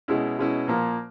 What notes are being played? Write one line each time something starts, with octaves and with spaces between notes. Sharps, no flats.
B2 G#3 C#4 E4
B2 G#3 C#4 E4
A#2 F3 A#3